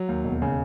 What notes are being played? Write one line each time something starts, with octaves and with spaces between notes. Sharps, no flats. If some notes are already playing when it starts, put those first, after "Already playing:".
Already playing: F#3
D#2
E1
C#3